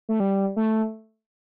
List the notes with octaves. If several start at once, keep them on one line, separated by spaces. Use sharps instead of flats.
A3
G3
A3